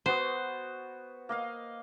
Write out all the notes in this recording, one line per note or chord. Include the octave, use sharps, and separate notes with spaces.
B3 F#4 C5 D#6
A#3 D#5 F5